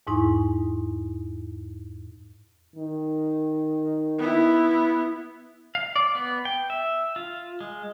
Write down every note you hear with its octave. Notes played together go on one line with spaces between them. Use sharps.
E2 G#2 D#4 E4 G#5 C#6
D#3
B3 E4
F5
D5
B3
G5
E5
F4
G#3